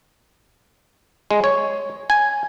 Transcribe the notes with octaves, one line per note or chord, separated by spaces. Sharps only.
G#3
C#5
G#5